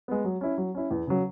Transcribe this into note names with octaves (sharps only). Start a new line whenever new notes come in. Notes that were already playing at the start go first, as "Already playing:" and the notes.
G#3 B3
F#3
C#4 E4
F#3
C#4 E4
E2
C#3 F#3